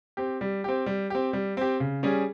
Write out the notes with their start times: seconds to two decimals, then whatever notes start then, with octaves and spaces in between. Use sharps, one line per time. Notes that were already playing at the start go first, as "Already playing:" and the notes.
0.17 C4 G4
0.41 G3
0.64 C4 G4
0.86 G3
1.10 C4 G4
1.33 G3
1.57 C4 G4
1.80 C#3
2.03 G3 C#4 G#4